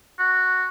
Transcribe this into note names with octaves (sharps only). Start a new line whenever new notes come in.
F#4